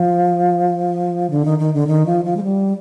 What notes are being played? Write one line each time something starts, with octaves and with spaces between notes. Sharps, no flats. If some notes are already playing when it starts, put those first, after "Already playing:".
Already playing: F3
D3
D#3
D#3
D3
D#3
F3
F3
G#3
G3